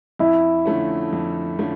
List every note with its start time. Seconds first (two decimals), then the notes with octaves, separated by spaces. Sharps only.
0.19 F2 E4
0.66 D3 F3 A3 C#4
1.13 F2
1.59 D3 F3 A3 C#4